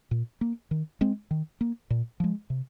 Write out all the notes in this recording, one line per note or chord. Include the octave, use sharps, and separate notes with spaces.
A#2
A#3
D#3
G#3 C4
D#3
A#3
A#2
F3 G#3
C3